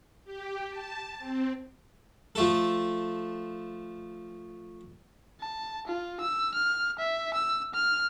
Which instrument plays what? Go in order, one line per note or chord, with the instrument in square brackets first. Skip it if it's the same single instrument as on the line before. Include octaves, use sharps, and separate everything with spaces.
[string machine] G4
A5
C4
[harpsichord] F3 A3 A4
[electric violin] A5
F4
E6
F6
E5
E6
F6